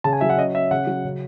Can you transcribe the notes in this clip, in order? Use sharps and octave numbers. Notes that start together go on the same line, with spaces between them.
C#3 A5
G#5
F#3 E5
F#5
C#4 D#5
C#4 E5
C#3 F#5
F#3
C#3